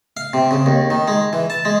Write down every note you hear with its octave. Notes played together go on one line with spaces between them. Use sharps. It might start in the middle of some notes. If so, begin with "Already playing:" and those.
F5
C3
C#3
D#2
D#3
G#3
E3
A5
G#3